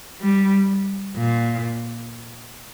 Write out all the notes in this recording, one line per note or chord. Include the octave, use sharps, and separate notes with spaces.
G3
A#2